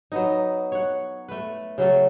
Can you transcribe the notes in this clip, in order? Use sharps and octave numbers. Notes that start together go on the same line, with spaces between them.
F#3 B3 D#4
C#5 F#5
A3 B4
C#3 F#3 A3 A4